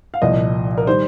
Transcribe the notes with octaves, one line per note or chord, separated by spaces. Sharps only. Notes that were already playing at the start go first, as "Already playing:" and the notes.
F5
C2 A#2 F3 D#5
A#4
D#3 G3 C5